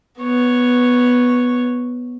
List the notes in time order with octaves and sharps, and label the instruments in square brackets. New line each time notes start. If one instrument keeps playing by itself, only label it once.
[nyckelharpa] B3 C#5